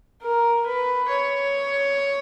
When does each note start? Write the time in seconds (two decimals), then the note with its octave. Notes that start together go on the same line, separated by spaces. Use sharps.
0.21 A#4
0.66 B4
1.09 C#5